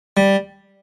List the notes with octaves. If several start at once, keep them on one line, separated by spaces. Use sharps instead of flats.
G3